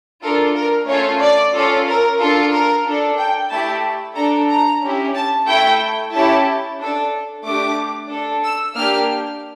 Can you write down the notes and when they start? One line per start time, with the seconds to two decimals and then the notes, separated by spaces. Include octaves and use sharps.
0.22 D4 F4 A4 A#4
0.56 A#4
0.88 A3 C#4 F4 A4 C#5
1.21 D5
1.54 C#4 F4 A4
1.87 A#4
2.20 D4 F4 A4
2.52 A#4
2.86 D4 A4
3.18 G5
3.51 A3 E4 G4 A5
4.16 D4 A4 A#5
4.49 A#5
4.82 C#4 E4 G4
5.15 A5
5.48 A3 E4 A4 G5
6.13 C#4 E4 G4 A5
6.79 D4 A4
7.44 A3 D4 G4 D6
8.10 D4 A4
8.43 E6
8.75 A#3 D4 G4 F6